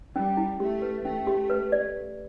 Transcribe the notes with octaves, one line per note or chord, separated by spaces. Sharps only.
G3 C#4
E4
A3 G4
B4
A3 C#4
G4
B4
D5